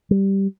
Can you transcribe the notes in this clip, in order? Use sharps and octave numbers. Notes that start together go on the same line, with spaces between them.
G3